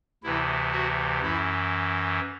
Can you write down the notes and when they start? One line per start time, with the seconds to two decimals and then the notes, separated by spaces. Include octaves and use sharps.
0.23 D2 C3 E3 E4
0.72 F#4
1.22 F#2 E3 E4